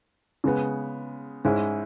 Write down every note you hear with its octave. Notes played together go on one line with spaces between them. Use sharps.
C#3 G#3 B3
G#2 G#3 C#4 E4